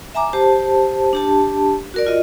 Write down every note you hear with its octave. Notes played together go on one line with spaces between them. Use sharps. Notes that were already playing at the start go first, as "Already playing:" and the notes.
E5 G#5 A#5 D6
G4 C5 A5
D4 G4 A5
F#4 A#4 D5
F4 D#5